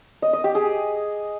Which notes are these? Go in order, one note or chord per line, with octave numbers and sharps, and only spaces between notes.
D#5
D#5
G4
G#4